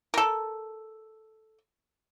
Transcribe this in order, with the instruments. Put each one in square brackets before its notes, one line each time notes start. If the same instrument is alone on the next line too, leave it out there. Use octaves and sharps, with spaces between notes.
[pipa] A4 A#4